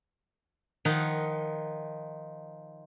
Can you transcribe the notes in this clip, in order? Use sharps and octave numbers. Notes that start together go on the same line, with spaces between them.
D#3 F3 D#4 F5 F#5